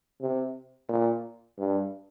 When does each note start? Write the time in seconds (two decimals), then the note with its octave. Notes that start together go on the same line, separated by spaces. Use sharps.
0.21 C3
0.89 A#2
1.58 G2